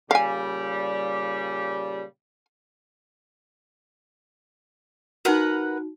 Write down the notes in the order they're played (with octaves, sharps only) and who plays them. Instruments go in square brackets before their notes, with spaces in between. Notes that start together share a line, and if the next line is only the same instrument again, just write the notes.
[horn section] A#2 C#3 G3 [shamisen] F5 G#5
[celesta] D#4 F#4 [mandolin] A#4 B4 F#5